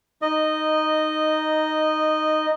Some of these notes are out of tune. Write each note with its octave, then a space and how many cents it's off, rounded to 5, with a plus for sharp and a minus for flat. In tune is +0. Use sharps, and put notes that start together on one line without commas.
D#4 +0 D#5 -10